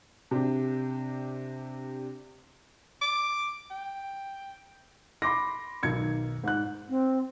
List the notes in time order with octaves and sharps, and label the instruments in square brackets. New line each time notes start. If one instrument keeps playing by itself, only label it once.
[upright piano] C3 D4 G4
[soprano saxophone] D6
G5
[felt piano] B5 C6 D6 A#6
B1 D#3 G#6 C#7
G#2 F#6
[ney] C4